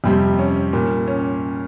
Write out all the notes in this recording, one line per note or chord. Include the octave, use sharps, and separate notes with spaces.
F2 C3 G3
C#4
A#2 G3
C#4